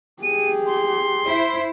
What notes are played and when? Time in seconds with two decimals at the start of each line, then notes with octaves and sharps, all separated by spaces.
0.23 G4 G#4 D#7
0.66 C6
1.26 E4 C5